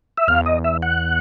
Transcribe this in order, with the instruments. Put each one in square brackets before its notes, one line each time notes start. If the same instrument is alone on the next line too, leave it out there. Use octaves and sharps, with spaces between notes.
[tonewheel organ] E5
[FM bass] E2 [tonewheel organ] F5
[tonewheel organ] D#5
E5
F#5